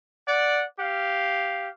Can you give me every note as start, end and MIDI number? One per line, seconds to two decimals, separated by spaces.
0.27 0.64 74
0.27 0.64 78
0.79 1.69 67
0.79 1.69 77